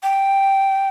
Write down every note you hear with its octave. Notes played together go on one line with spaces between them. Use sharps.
G5